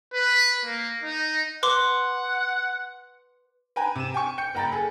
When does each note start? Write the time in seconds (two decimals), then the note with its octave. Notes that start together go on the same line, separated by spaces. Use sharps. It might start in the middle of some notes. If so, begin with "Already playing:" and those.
0.13 B4
0.65 A#3
1.03 D#4
1.63 B4 F#5 C6 D6
3.76 B4 G5 G#5 A#5
3.96 C3 D#7 E7
4.14 G5 G#5 C#6
4.38 G5 G6 C#7
4.55 F#1 G5 A#5 B5 A6
4.72 G#4 A4